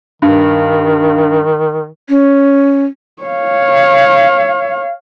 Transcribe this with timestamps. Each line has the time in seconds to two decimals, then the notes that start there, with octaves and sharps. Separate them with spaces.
0.22 G2 D#3
2.09 C#4
3.23 C#5 F5